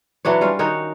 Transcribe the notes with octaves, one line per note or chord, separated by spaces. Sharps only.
E3 F#3 D4 C#5
G3 C#4 F4
D#3 D#4 F#4 C#5